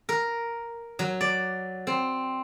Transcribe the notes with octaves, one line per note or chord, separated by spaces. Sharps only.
A#4
F#3
D5
C4